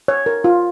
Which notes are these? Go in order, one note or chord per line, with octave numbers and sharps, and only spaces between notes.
C#5
A#4
F4